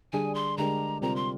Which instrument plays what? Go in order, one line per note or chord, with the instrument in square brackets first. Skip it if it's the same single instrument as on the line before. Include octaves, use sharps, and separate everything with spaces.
[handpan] D3 G3 D4 G#4 [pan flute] G#5
[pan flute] C6
[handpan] D3 G#3 D4 G4 A#4 [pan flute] A#5
[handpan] C3 G3 C4 F4 A#4 [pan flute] A#5
[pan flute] C6